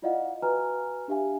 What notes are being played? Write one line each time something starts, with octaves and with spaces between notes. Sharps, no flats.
E4 F4 D5 D#5 F5 F#5
F#4 B4 G#5 A#5 F6
D4 G4 E5 F5 G#5